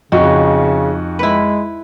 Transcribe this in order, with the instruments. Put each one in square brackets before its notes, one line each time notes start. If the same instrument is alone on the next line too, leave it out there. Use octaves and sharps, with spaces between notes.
[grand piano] F2 F#4 [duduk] C#3 [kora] D#4
[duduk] G#3 [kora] E4 B4